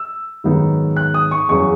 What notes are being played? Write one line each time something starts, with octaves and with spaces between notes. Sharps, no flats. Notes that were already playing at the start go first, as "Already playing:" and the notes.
Already playing: E6
G#2 D#3 F#3 B3 D#4
F#6
D#6
C#6
E2 C#3 F#3 C#6